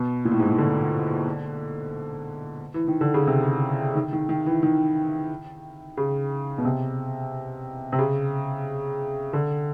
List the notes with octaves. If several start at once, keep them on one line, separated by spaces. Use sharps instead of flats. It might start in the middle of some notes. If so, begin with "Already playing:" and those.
Already playing: B2
A#2
A2
G#2
A2
D3
E3
D#3
D3
C#3
C3
D#3
D#3
D#3
E3
D#3
C#3
B2
C3
C3
C#3
D3